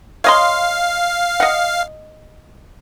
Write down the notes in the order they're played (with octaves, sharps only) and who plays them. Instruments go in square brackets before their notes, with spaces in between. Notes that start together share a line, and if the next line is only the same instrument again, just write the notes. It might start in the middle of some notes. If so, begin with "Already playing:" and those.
[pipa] C#5 D#5 C6 [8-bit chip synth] F5
[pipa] D#5 F#5